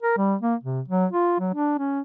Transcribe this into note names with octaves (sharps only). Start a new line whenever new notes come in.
A#4
G3
A#3
C3
F#3
F4
F#3
D4
C#4